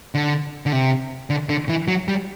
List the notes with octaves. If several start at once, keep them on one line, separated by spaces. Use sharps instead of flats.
D3
D3
C3
D3
D3
E3
F#3
G3